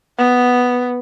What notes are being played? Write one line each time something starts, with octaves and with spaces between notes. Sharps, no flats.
B3